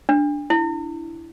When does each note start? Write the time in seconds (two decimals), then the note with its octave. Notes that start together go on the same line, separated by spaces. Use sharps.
0.09 D4
0.50 E4